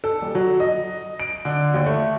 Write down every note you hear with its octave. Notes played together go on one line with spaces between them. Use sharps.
A4
D#1
F#3
D#5
D7
D3
D#2
A3